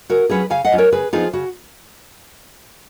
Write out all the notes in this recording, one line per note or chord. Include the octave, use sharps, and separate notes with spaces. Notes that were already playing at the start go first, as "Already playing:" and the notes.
C#3 F#4 A#4
F#3 C#4 F4 G#4 B4
C#3 F5 G#5
D#5 F#5
F#3 C#4 F4
A#4 C#5
C#3 G#4 B4
F3 G#3 B3 D#4 F4 G#4
C#3 F#4